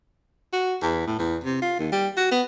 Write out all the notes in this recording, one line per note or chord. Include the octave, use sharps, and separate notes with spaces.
F#4
E2
A2
E2
C3
F4
D#2
G3
F#4
B3